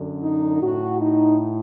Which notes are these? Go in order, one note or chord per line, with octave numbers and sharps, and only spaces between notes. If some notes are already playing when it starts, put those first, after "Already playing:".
Already playing: F#2 D3
D#4
A2 F#4
D#4